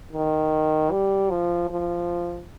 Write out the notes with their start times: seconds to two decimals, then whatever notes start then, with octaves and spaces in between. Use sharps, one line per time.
0.13 D#3
0.91 G3
1.30 F3
1.70 F3